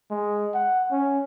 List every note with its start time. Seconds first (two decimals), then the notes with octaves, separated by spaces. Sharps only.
0.11 G#3
0.54 F#5
0.92 C#4